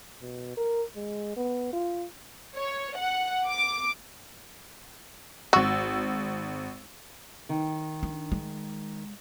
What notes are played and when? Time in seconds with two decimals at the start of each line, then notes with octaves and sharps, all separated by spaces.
0.22 B2
0.57 A#4
0.96 G#3
1.37 B3
1.73 F4
2.56 C#5
2.98 F#5
3.48 D6
5.53 G#1 F#4 E6
7.49 D#3
8.03 D4
8.32 G#3